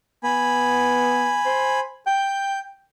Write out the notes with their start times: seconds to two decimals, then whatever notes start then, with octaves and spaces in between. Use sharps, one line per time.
0.23 B3 G#5 B5
1.46 C5
2.07 G5 G6